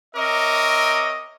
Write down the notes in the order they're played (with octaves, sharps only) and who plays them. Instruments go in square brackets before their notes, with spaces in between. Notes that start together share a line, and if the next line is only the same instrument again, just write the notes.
[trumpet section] C4 A#4 C#5 D#5 E5 D6